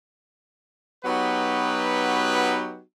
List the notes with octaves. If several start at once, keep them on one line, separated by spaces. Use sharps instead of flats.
F#3 B3 D#4 F#4 G4 B4